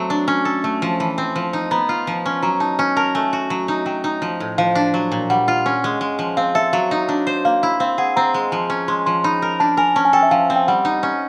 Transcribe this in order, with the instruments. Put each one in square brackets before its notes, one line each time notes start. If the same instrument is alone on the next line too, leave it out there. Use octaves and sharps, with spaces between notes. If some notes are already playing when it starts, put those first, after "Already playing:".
Already playing: [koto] F#3 A3 C4
D4
C#4
A4
A3
F3
[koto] E3 [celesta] A5
[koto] C4
F3
D#4
[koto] B3 [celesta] A#5
[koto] F4
F3
C#4
[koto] F#3 [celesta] A#5
[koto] D#4 [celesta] A5
[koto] C#4
[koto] A#4 [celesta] A5
[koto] A3 [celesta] G#5
[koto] F#4
F#3
D#4
[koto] F#3 [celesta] G5
[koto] D#4
F3
A2
[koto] F3 [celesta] F5
[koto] D4
F#3
A#2
[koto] G3 [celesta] F#5
[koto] F4
C#4
G#3
G#3
F3
[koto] C4 [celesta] F5
[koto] A4 [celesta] E5
[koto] F#3 [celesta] F5
[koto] D#4
D4
C5
[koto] A#3 [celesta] F5
[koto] E4
[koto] C4 [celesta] F5
[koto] G#4 [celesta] F#5
[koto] C4 [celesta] A#5
[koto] G#3
F3
C#4
[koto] G#3 [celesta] C6
[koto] F3 [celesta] C6
[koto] D#4 [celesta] B5
[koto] A#4
[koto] D4 [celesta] A5
[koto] A#4 [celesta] G#5
[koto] C#4 [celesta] A5
[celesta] G#5
[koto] A4 [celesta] G5
[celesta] E5
[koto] F3 [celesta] F5
[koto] C4
[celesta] G5
[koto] G3 [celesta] F#5
[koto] D#4
C#4